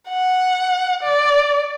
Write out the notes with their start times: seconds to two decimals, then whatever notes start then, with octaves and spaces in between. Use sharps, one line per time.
0.09 F#5
1.03 D5